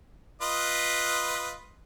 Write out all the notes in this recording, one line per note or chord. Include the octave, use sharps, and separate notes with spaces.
F4 B4 D#5